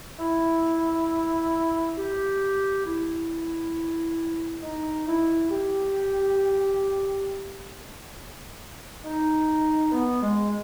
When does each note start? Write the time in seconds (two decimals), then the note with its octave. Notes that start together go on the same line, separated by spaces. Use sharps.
0.19 E4
1.96 G4
2.85 E4
4.62 D#4
5.06 E4
5.50 G4
9.04 D#4
9.92 B3
10.21 G#3